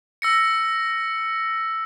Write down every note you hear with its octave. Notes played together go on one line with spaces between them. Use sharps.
E6 A#6 C#7